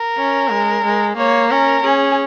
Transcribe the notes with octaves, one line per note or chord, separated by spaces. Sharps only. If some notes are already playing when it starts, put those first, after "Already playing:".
Already playing: A#4
C#4
G#3
G#3
A#3 C#5
C#4 A#4
C#4 G#4